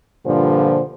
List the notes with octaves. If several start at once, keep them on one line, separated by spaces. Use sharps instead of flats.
G2 A#2 D3 F3 C5